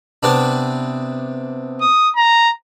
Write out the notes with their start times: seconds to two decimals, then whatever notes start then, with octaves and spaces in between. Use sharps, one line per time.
0.23 C3 B3 D4
1.81 D#6
2.16 A#5